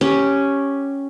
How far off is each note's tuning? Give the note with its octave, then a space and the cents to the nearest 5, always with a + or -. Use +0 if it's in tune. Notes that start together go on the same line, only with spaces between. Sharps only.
C#4 +0 G4 +0